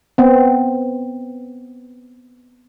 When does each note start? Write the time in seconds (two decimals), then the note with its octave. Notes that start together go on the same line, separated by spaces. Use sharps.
0.18 B3 C4